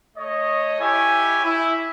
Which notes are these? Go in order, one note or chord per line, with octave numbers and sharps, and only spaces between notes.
A3 C#5 D#5
E4 G4 C#5 E5 G#5
E4